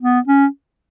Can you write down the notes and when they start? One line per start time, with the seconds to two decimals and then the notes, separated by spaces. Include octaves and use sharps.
0.01 B3
0.28 C#4